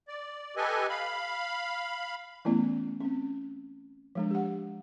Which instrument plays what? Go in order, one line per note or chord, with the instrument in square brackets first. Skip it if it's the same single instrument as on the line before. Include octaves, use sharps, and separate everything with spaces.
[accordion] D5
G4 A4 B4 D#5 G#5
F5 B5
[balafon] E3 A3 B3 C#4 E4 D5
C4 C#4
F3 G#3 D4
G4 F#5